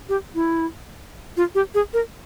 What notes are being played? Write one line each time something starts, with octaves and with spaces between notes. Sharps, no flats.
G4
E4
F4
G4
G#4
A#4